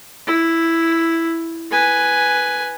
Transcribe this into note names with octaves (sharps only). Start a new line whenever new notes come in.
E4
B4 G#5